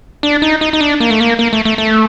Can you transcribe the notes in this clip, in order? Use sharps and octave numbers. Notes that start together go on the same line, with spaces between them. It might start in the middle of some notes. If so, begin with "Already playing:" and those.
D4
D#4
D#4
D#4
D4
A#3
A3
A#3
A#3
A3
A3
A3